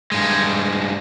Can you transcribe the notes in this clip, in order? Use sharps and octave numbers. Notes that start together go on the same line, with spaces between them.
G2 G#3